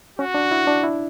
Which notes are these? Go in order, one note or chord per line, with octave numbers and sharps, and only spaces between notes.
C#4 F#4
D4
E4
D4
E4